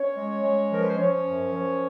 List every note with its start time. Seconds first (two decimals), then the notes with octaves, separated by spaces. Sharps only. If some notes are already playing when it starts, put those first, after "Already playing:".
Already playing: C#4 C#5
0.16 G#3
0.43 G#3
0.71 F3 A#4
0.80 B4
0.90 C5
0.98 F3 C#4 C#5
1.26 F#2
1.53 F3